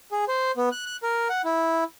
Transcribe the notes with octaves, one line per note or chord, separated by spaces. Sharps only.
G#4
C5
B3
F#6
F#6
A#4
F#5
E4